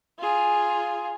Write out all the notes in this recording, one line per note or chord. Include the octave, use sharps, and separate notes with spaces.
F4 G#4